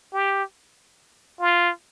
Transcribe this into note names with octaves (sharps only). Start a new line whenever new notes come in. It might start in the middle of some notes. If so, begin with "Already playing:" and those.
G4
F4